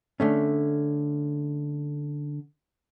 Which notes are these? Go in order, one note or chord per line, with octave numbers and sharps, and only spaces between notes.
D3 A3 C#4